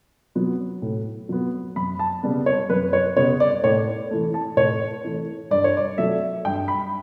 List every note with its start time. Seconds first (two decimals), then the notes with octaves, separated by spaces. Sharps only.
0.35 F#3 B3
0.82 A2
1.29 F#3 B3
1.76 F#2 B5
1.99 A5
2.23 C#3 G3 B3
2.46 C#5
2.70 F#2 B4
2.93 C#5
3.17 C#3 G3 B3 C#5
3.40 D5
3.64 A2 C#5
4.11 E3 A3
4.34 A5
4.57 A2 C#5
5.05 E3 A3
5.51 G2 D5
5.64 C#5
5.77 D5
5.98 F#3 A3 E5
6.45 G2 G5
6.68 B5